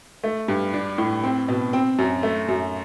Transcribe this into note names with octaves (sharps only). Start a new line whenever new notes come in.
A3
G2
D4
A2
C4
B2
C4
F#2
A3
F#2